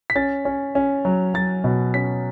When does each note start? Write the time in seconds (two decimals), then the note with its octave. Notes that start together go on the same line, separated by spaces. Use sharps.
0.10 B6
0.15 C#4 A6
0.45 C#4
0.75 C#4
1.05 F#3
1.34 F#3 A6
1.64 B2
1.94 C#4 B6